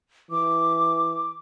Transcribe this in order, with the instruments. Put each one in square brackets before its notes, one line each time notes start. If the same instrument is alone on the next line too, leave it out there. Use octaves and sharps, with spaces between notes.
[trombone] E3 [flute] D6